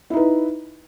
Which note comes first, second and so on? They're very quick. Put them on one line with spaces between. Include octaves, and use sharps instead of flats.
E4 D#4 B4